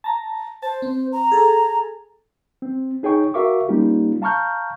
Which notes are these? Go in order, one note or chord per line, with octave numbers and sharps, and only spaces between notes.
A5 A#5
C5 A5
C4
A#5
G#4 A4
C4
D#4 G#4 C#5 G5 C#6
F#4 A#4 E5 F5 C#6 D6
G3 A#3 C#4 D#4 F4 G4
F5 A5 A#5 C#6 F6 G6